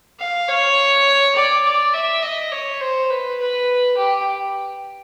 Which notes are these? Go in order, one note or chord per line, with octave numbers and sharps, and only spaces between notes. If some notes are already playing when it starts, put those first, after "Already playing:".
F5
C#5
D5
D5
E5
D#5
C#5
C5
B4
B4
G4